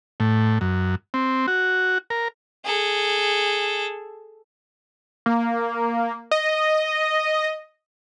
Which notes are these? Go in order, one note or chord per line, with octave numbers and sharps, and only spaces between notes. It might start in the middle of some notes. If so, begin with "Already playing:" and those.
A2
F#2
C4
F#4
A#4
G#4 A4
A#3
D#5